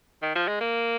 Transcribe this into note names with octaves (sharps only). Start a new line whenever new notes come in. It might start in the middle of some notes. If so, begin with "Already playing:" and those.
D#3
F3
G#3
A#3